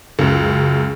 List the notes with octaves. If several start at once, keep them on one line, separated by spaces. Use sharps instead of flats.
C#2 F#2